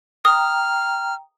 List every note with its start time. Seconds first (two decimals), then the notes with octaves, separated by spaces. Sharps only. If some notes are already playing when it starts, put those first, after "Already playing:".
0.25 G5 A#5 D#6 F6